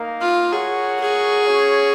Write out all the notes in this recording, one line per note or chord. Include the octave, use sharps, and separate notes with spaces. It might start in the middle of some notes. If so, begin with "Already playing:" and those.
Already playing: A#3 D#4 A#4 F5
F4
F#4 G#4 A#4 C#5 F#5
G#4
C#4 F#4 C#5